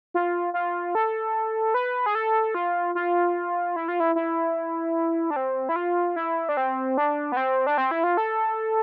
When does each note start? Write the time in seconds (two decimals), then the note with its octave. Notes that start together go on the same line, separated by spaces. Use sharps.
0.14 F4
0.54 F4
0.95 A4
1.74 B4
2.06 G#4
2.15 A4
2.54 F4
2.95 F4
3.76 E4
3.88 F4
4.00 E4
4.16 E4
5.30 D4
5.36 C4
5.69 E4
5.76 F4
6.16 E4
6.49 D4
6.57 C4
6.97 D4
7.32 B3
7.37 C4
7.67 D4
7.78 C4
7.91 E4
8.04 F4
8.17 A4